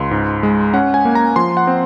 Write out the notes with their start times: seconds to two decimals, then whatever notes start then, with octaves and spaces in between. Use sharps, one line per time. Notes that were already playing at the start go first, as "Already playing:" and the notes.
Already playing: C#2 C6
0.11 G#2
0.43 G#3
0.73 C#4 F#5
0.94 G#5
1.05 A#3
1.15 A#5
1.36 F3 C6
1.57 F#5
1.67 C4